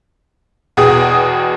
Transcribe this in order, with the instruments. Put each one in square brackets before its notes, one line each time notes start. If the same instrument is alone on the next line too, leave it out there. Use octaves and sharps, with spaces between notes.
[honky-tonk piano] E2 B2 G#4 G5 D#6